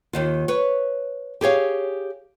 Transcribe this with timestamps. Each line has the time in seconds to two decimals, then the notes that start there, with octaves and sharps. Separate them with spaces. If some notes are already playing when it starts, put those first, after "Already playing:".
0.13 D#2 D#3 F4
0.48 B4 C#5
1.41 G4 G#4 C#5 F5